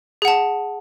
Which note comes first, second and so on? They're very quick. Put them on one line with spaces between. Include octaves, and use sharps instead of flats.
G#4 F#5 A5